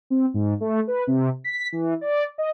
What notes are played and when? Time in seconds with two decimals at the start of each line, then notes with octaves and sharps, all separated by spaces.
0.10 C4
0.34 G#2
0.60 A3
0.87 B4
1.07 C3
1.44 B6
1.72 E3
2.01 D5
2.38 D#5